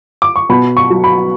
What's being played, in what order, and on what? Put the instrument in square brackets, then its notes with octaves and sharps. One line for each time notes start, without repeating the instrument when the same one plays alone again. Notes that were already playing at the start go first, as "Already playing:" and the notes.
[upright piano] D6
C#6
B2 B5
C#6
F#3
B5